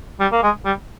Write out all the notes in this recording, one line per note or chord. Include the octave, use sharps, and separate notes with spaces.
G3
A#3
G#3
G3